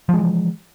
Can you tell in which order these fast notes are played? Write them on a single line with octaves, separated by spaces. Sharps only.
F3 G#3 E3